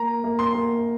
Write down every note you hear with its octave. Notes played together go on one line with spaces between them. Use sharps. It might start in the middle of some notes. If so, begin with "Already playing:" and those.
Already playing: A#3 A#5
A#3
C6
A#3